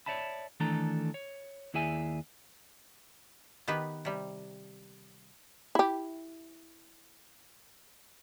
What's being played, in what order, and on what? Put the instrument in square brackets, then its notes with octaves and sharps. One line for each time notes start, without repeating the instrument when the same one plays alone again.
[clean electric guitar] C#5 D5 E5 A5 B5
D#3 E3 A3 D4 A4 A#5
C#5
D#2 E4 G#4 D5 E5 G#5
[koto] D#3 B3 G4 B4
C3 G3
[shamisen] E4 G4